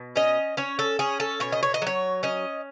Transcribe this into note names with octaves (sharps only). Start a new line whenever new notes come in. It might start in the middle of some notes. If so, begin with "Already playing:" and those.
Already playing: B2
C#4 D#5
C#4 C#5
A4
C#4 G#4
A4
B2 C#5
D#5
C#5
D#5
F#3 C#5
C#4 D#5